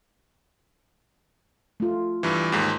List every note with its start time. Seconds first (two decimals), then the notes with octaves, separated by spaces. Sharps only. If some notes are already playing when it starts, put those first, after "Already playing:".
1.80 A3 F4
2.23 G2 E3
2.52 D#2 G#2